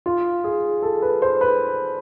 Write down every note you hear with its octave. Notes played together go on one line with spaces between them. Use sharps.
F4
G#4
A4
B4
C5
B4